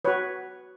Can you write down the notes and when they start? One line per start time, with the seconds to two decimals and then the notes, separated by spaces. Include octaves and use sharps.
0.05 F#4 B4 C#5